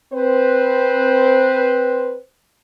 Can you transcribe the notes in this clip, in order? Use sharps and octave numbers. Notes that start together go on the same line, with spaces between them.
C4 B4 C5